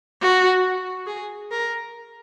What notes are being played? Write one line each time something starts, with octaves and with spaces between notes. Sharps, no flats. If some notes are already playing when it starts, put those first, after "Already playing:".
F#4
G#4
A#4